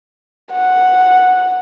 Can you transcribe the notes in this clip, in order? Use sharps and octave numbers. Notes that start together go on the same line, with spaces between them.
F#5